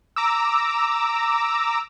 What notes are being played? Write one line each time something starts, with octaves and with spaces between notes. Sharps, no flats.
A#5 D6 E6